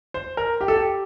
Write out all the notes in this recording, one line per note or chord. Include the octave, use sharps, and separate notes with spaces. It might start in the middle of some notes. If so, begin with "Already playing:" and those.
C5
A#4
G4
A4
G4